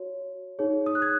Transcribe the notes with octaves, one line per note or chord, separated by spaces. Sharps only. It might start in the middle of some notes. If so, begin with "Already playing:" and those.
Already playing: F#4 C#5
D#4 G#4 C#5
D#6
F#6
G#6